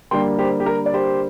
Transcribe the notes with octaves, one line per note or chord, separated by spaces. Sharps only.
D3 G3 A#3 G5 C6
G4 C5
G4
A#4
D5
G4 C5